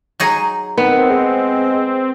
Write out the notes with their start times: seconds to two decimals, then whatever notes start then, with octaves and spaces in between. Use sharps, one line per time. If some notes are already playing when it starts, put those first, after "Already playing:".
0.20 F#3 D#4 G#4
0.78 D#3 B3 C4
1.10 G#3